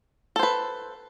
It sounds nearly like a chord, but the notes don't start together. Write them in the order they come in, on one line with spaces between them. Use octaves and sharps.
A4 C5 B4